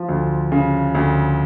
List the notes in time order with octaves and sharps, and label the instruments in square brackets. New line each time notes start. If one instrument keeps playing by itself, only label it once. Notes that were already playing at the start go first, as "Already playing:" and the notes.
Already playing: [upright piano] F3
D2
C#3
D2